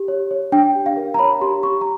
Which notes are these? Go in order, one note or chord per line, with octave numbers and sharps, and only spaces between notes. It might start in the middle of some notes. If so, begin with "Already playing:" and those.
Already playing: G4
C#5
C#5
D4 G5
G4
F5
A#4
A#5
C#5 B5
G4 C6
G4 C#6
A#5